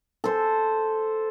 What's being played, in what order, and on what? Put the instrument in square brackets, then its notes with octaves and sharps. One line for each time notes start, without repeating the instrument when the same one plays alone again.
[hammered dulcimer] A4 C5